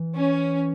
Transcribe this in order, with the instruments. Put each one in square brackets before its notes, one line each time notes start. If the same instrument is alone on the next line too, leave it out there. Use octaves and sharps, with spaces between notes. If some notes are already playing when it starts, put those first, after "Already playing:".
Already playing: [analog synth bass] E3
[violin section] C#4